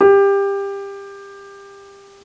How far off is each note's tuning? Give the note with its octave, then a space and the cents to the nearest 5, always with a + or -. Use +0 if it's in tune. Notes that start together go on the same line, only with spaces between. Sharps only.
G4 +20